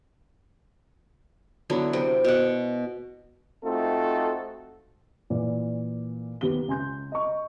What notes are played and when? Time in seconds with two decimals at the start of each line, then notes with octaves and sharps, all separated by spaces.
1.70 D3 F#3 B3 E4
1.93 C3 C4
2.24 B2 F#5
3.64 A3 C4 D#4 F4 F#4 A4
5.30 A#2 E3 D5
6.41 D#2 B3 G4 G7
6.68 C#2 G#5 C6 G6
7.12 D#5 C#6